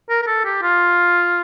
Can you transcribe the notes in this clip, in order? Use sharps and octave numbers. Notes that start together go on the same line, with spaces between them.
A#4
A#4
A4
G4
F4